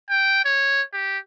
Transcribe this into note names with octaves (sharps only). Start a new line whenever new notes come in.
G5
C#5
G4